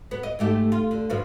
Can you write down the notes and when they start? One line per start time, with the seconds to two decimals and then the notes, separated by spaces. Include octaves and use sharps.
0.11 B3
0.23 D#5
0.39 G#2 A3 G4
0.72 F4
0.91 D3
1.10 G2 B2 F3